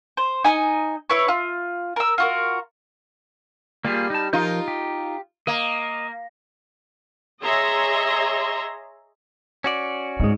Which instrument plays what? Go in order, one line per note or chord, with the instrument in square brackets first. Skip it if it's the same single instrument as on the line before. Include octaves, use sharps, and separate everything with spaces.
[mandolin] C5
D#4 D#5 G#5 A#5
E4 B4 C#5
F4
A#4 E6
F4 F#4 A#4
[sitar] G3 [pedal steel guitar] A#3 F4 G#4
[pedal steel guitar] D#4 A5
[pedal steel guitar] F3 A#4 G6 [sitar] D#4 F4
[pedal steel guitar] G4
[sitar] A#3 [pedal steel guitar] D#5
[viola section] G#4 C#5 D#5 E5 A#5 C6
[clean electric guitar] C#4 F#4 D5
[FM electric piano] G#2 G#3 [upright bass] D#4